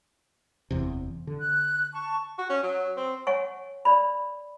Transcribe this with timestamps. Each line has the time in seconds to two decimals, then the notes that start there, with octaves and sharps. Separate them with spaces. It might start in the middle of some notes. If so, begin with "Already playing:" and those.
0.71 F#1 E2 C3
1.27 D3
1.40 F#6
1.93 A5 C#6
2.38 F#4
2.49 C#4
2.63 F#3
2.97 C4
3.27 C#5 F#5 G#5 C#6
3.85 D5 B5